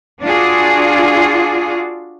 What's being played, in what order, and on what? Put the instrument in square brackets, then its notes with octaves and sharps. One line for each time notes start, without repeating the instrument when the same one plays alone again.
[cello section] D4 F4 F#4 G#4